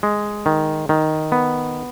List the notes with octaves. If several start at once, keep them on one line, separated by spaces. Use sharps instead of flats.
G#3
D#3
D#3
B3